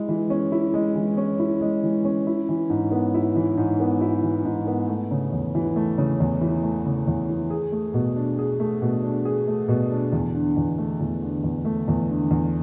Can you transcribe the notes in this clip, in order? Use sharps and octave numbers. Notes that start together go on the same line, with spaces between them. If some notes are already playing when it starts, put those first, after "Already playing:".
Already playing: G#3 E4
E3
C#4
E4
G#3
E3
C#4
E4
G#3
E3
C#4
E4
E3
G#2
B3
E4
E3
G#2
B3
E4
E3
G#2
B3
A3
C#3
E2
E3
A3
C#3
E2
E3
A3
C#3
E2
E3
G#4
A3
B2
D4
G#4
A3
B2
D4
G#4
A3
B2
D4
E2
D3
E2
A3
E2
D3
E2
A3
E2
D3
E2